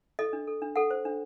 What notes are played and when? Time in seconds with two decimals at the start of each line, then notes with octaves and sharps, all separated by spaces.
0.19 A4 D#5
0.33 D4
0.47 A4
0.62 D4
0.76 A4 F#5
0.91 C5
1.05 D4